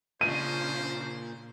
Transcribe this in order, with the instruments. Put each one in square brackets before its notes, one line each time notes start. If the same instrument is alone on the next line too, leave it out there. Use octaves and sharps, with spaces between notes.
[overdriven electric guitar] A#2 [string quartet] C#3 F3 D4 [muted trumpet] C5 [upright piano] D#7